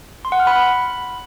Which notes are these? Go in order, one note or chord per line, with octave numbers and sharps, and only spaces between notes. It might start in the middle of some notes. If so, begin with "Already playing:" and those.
C6
F#5
F6
B5